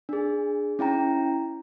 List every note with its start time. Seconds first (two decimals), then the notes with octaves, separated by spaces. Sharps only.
0.09 D4 G#4
0.79 C#4 E4 G5 A#5